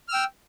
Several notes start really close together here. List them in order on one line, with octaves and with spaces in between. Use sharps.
F6 E6 G5